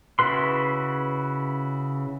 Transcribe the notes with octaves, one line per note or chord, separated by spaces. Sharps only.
C#3 E4 F#4 B4 C6